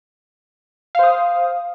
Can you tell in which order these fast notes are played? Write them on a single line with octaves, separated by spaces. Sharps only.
F5 C5 D#6